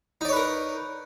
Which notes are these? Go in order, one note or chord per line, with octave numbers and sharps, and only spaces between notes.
D#4 A#4 B4 C#5 D5